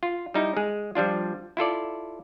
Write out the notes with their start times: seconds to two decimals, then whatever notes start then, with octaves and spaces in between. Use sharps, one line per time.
0.03 F4
0.34 G3 D#4 E4
0.57 G#3 G#4
0.95 F3 G3 D4 F4
1.57 E4 F4 A4 D5